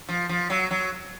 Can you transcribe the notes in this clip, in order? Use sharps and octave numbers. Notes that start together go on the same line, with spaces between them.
F3
F3
F#3
F#3